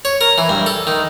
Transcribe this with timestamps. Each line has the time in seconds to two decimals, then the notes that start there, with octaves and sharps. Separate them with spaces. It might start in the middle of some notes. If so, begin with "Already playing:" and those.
0.05 C#5
0.21 A#4
0.38 E3
0.49 G2
0.66 A4
0.87 D#3